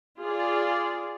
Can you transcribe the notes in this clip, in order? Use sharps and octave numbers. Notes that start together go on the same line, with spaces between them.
F4 G#4 D5